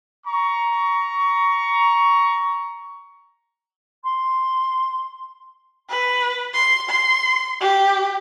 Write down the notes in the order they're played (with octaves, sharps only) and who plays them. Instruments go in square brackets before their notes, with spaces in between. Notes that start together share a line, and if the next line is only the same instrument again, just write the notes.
[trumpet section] A#5 C#6
[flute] C6
[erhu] B4
C6
C6
G4